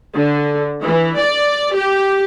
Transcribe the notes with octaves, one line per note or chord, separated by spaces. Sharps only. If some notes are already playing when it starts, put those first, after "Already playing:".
D3
E3
D5
G4